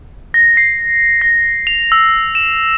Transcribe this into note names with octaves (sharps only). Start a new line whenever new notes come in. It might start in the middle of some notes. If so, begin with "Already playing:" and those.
A#6
C7
A#6
F7
E6
E7